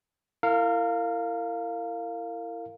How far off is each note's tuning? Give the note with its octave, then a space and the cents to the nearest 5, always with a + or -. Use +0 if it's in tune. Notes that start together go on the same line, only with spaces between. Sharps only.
E4 +15 A#4 -35 F5 +0